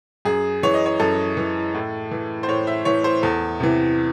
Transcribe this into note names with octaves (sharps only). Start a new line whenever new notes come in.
F#2 G#4
E3 C#5
D#5
C#5
F#2 A4
E3
A2
E3
C5
A2 C#5
E5
E3 C#5
C5
E2 A4
C3 E3